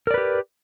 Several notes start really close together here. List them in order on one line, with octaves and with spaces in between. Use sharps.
A#4 D5 B4 G4